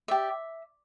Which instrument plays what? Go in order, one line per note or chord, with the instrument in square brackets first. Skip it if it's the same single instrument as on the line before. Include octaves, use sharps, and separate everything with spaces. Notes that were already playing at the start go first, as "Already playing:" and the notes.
[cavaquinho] G4 D5 E5